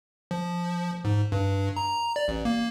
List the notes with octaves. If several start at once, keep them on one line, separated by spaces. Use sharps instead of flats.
F3
G#2
G2
A#5
D5
A1
A#3